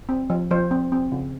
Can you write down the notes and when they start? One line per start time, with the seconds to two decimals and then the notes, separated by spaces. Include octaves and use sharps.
0.09 C4
0.30 F3
0.51 F3 C5
0.71 C4
0.92 C4
1.12 C#3